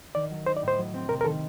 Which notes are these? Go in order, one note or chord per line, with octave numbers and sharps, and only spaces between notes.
D#3 D5
F#3
D#4 C5
D5
A2
C5
F#3
C4
C3 A#4
A#4
D#3 A4